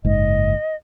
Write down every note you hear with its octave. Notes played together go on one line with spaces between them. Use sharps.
F#1 G#2 D#5